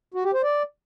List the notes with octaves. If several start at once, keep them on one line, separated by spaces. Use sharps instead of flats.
F#4
G4
C5
D5